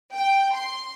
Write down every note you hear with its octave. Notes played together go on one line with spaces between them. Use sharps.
G5
C6